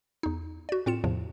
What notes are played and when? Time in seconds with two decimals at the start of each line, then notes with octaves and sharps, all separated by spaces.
0.23 E2 D#4
0.69 F#4 D5
0.86 A2 C4 F4 C#7 E7
1.04 E2 A2 C3 F3